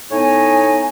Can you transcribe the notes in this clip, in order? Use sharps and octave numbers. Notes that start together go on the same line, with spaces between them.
A2 B3 D#4 C#5 G#5